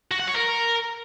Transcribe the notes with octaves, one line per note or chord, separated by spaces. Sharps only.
F#4
F#5
C#5
A#4